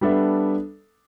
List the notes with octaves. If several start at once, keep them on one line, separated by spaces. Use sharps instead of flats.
G3 B3 D4 A4 E5